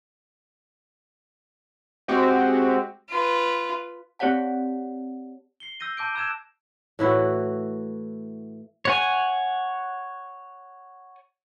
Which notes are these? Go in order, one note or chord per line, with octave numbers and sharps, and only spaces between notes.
G#3 C4 F#4 G4
F4 B4
C4 G4 C#5 D5 F#5 A5
C7 C#7 G7
E6 G6 A#6 D#7
A5 D6 G6 D7
A#5 E6 F#6 G#6 E7
A2 E3 E4 F#4
C#5 F#5 G#5